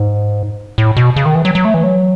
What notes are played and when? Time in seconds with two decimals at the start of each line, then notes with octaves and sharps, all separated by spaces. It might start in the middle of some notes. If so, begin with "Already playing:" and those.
Already playing: G#2
0.78 A2
0.97 B2
1.16 C#3
1.26 D#3
1.35 E3
1.45 F#3
1.55 F#3
1.65 A3
1.74 E3
1.84 F#3